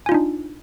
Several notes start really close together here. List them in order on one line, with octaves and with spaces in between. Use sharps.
G#5 F4 D#4 D4